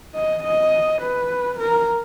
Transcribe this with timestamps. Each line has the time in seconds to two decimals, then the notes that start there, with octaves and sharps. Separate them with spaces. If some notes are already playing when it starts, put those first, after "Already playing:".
0.15 D#5
0.43 D#5
1.02 B4
1.59 A#4